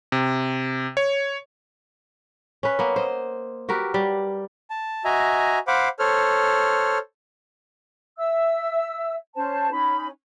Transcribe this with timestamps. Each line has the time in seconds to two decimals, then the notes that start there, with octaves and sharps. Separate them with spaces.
0.12 C3
0.97 C#5
2.63 C#4 B4
2.79 A#3 B3
2.96 C5 D#5
3.69 F#4 G4 A#4 B4
3.94 G3
4.70 A5
5.05 F#4 D#5 E5 G#5 A#5
5.67 C5 F5 F#5 B5 D6
5.99 A4 C5 C#5 F6
8.17 E5 E6
9.35 C#4 C5 A5
9.71 C#4 D#4 B5